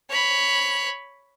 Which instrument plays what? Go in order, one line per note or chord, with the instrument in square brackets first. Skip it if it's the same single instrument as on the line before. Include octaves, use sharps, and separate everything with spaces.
[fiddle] C#5 B5